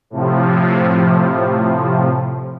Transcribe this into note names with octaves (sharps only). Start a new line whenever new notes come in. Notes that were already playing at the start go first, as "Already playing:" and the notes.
A2 C3 F3